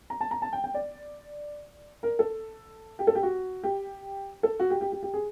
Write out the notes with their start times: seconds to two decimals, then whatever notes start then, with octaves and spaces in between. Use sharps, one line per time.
0.10 A#5
0.21 A5
0.31 A#5
0.42 A5
0.53 G5
0.64 G5
0.74 D5
2.03 A#4
2.19 A4
2.99 G4
3.07 A4
3.15 G4
3.23 F#4
3.64 G4
4.43 A4
4.60 F#4
4.70 G4
4.81 G4
4.92 G4
5.03 G4
5.14 G#4